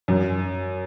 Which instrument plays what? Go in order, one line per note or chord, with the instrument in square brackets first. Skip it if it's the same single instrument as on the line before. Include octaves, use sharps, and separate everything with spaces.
[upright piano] F#2